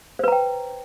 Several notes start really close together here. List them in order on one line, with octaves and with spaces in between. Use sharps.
C5 B4 A#5 G5